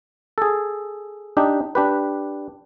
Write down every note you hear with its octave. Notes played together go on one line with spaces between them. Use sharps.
G#4 A4
D4 D#4 G4
D4 G4 B4